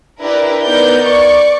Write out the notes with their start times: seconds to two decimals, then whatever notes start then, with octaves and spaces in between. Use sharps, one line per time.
0.21 D4 E4 G4 A#4 B4
0.64 B3 D#4 A#4 D5 G6
1.02 D5 C#6